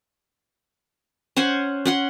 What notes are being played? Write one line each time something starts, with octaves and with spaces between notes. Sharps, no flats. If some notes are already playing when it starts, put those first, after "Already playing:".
C#4 C5 F#5 G#5
C#4 F#5 C6